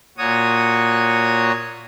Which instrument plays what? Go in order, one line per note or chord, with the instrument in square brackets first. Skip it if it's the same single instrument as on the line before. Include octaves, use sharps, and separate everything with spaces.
[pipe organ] A#2 F#4 C#5 D#6